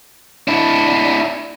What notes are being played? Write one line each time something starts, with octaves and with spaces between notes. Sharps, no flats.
D4 E4